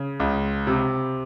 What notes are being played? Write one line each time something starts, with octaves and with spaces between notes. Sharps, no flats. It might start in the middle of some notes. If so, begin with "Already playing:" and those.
Already playing: C#3
C#2
C3